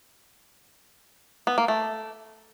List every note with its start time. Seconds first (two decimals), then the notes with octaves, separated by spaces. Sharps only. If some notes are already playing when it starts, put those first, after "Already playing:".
1.47 B3
1.58 A#3
1.68 A3